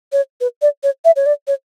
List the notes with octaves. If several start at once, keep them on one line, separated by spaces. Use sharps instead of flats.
C#5
B4
D5
C#5
E5
C#5
D5
C#5